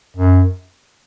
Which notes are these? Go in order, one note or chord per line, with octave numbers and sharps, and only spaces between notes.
F#2